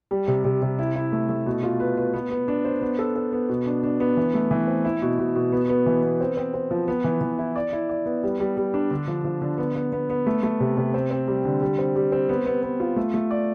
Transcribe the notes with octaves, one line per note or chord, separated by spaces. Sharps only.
G3
C3
C3
C3
E4
E4
A3
A3
B2
F4
B4
B4
B3
B3
D4
C5
B3
A4
A4
B3
B2
D4
D4
B3
E3
A3
E3
C4
E4
B2
B2
B2
B3
B3
E3
B3
C4
C4
C4
F3
B3
E3
E3
E4
D5
E4
D5
B3
G3
G3
G3
D4
D3
F3
F3
D3
B3
B3
B3
B3
A3
A3
C3
C3
C4
C4
G3
D3
G3
C4
G3
C4
B3
B3
B3
F4
A3
A3
D5